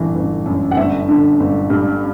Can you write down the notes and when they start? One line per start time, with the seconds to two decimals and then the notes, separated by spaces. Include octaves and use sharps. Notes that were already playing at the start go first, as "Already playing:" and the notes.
Already playing: G1 E3
0.15 G1
0.46 F#2
0.71 F#5
0.77 G1 E5
1.08 D3
1.40 G1
1.70 G2